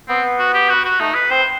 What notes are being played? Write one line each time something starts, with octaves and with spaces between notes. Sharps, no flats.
B3 C4
F#4
G4
F#4
F#4
A3 D#4
B4
C4 C5